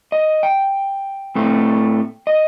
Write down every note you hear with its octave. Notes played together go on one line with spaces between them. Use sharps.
D#5
G5
A2 A3 C4
D#5